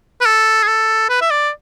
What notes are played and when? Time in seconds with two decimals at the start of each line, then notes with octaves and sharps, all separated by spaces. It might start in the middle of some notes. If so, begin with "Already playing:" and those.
0.21 B4
0.26 A4
0.63 G#4
0.67 A4
1.09 B4
1.21 E5
1.31 D5